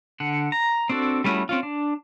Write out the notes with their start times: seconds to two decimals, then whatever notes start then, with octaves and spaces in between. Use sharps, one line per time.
0.20 D3 F#5
0.52 A#5
0.90 C4 D4 F#4 A4
1.24 G3 A3 C#4 E4 F#4
1.49 C4 C#4 F4
1.63 D4